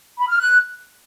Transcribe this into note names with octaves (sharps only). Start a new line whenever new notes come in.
B5
F6
F#6